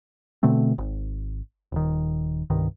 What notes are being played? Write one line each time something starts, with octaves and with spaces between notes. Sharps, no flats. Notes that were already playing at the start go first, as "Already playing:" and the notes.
B2 D3 A3 C4
G#1
D#1 D#3
C2 G2 D#3